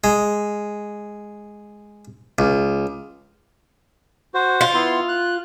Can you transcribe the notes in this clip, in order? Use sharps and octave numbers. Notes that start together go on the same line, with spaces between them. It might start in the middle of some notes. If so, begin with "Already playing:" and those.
G#3
C#2
F#4 C5
F4
B3 E4 C6
F#6